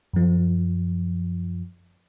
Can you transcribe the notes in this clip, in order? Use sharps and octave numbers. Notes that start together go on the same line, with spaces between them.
F#2 F3